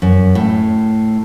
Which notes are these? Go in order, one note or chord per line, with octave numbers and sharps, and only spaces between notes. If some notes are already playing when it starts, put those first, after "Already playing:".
F#2
A2